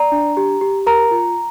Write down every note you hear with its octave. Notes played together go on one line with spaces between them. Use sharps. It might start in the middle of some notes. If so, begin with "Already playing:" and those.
Already playing: D5 A#5
D4
G4
G4
A#4 A#5
F4